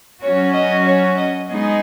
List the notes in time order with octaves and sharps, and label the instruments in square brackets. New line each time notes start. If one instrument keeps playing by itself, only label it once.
[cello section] F#3 C#4 F#4 [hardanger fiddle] C#5
[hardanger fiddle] D#5
C#5
D#5
[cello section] G#3 B3 D#4 G#4 [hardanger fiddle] D#5